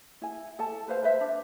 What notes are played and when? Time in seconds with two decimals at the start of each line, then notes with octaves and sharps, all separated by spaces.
0.22 E4 G#5
0.59 A4 A5
0.88 B4 C5 F5
1.03 B4 C5 E5
1.21 D4